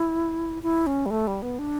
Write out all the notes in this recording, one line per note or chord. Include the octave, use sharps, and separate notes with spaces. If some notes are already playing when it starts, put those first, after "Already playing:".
Already playing: E4
E4
C#4
G3
A3
G3
B3
D4